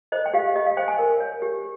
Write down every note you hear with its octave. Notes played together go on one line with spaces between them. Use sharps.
C5 D#5
G5
G4 F5
G4 D#5
F5
C5 G5
G#5
A#4
C#5
G4